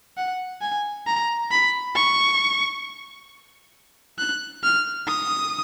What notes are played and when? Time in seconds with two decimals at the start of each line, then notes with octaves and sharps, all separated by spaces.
0.17 F#5
0.61 G#5
1.07 A#5
1.51 B5
1.96 C#6
4.19 F#6
4.64 F6
5.08 D#6